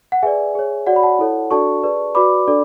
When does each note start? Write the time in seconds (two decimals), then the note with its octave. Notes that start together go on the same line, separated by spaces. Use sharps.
0.12 F#5
0.23 G#4 B4 D5 E5 G#5
0.55 G#4 C#5
0.87 F#4 C#5 D5 F#5
0.96 B5
1.03 F#5 A5
1.19 E4 A4 C#5
1.51 D4 F#4 A4 D5 A5 C#6
1.83 G#4 B4 D5
2.15 F#4 B4 D5 B5 D6
2.48 D4 A4 D5